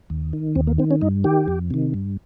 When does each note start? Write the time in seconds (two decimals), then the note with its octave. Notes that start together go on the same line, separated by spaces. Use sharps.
0.10 D#2
0.33 D#3
0.56 D#2 C4
0.67 A#3
0.78 D#3 C4
0.91 C#4
1.02 G2 D#4
1.24 D#3 G4
1.48 F2
1.70 C3 D#3
1.94 G2